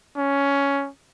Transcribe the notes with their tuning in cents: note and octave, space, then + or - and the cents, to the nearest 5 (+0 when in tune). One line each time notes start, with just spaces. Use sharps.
C#4 +10